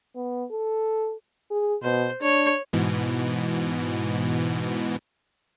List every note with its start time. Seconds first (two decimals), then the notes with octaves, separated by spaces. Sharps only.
0.16 B3
0.52 A4
1.51 G#4
1.83 B2 C5
2.22 D4 C#5
2.73 G#2 B2 E3